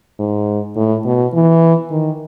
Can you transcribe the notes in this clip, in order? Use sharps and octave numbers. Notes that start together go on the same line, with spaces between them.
G#2
A2
B2
E3
D#3